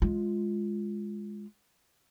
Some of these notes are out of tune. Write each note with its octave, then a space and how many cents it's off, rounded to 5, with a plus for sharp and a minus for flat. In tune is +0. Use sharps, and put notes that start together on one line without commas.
G#3 +0 F4 +0